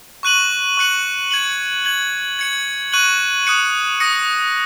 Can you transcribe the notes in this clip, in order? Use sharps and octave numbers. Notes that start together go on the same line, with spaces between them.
C#6 F#6 D#7 F#7
C#6 F#6 C#7 F#7
G#6 C#7 F#7
G#6 F#7
G#6 C#7 F#7
C#6 F#6 D#7 F#7
D#6 F#6 C#7
D#6 A#6 C#7